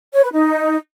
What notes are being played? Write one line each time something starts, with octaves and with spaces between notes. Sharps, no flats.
C#5
B4
D#4